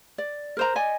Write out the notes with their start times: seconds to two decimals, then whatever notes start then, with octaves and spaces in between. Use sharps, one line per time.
0.18 D5
0.57 A#4 C5 A#5
0.75 D5 D#5 G#5